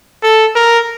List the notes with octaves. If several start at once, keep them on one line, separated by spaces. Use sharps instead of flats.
A4
A#4